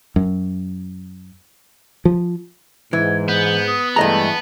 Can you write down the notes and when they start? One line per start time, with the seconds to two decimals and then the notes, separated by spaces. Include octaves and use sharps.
0.16 F#2
2.05 F3
2.93 G#2 E3 G#6
3.28 B3 G6
3.67 D#6
3.96 G2 E3 G#3 A3 D#5 A5 A#5